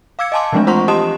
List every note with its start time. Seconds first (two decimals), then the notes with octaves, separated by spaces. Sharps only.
0.19 F5 D6 E6 G#6 C#7
0.32 D#5 F5 G#5 A5 C6 D6
0.53 E3 F3 G#3 A3 C4 D4
0.67 F4 C5 F#5 A#5 C6 C#6
0.88 G4 D#5 A5 C6 D#6 E7